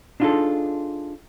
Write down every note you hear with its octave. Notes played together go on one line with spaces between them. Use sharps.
D4 D#4 F4 F#4 G#4 A4